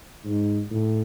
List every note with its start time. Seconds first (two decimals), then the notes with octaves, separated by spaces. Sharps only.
0.25 G#2
0.71 A2